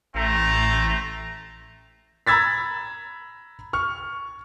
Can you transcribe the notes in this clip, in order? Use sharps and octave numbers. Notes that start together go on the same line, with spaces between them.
A1 A3 C4 A#5
A#5 B5 E6 G#6 A6 B6
C#6 F6